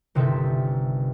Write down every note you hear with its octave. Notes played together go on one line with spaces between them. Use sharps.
G1 C3 D#3 A4 E5